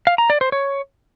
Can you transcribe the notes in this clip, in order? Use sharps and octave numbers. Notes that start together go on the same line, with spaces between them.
F5
A#5
D5
C5
C#5